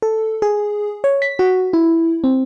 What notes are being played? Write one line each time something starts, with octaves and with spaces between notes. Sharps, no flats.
A4
G#4
C#5
B6
F#4
E4
C4